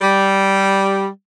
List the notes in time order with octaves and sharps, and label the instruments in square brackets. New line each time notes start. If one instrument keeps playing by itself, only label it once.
[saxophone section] G3